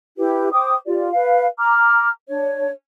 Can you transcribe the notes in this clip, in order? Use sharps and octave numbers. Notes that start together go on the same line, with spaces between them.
E4 G4 B4
C5 G5 D6 D#6
F4 G4 D5
B4 F5
A#5 D6 F6
D4 C#5